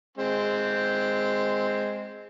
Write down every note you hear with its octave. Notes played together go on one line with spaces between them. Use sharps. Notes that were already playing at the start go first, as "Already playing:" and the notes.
G#3 C4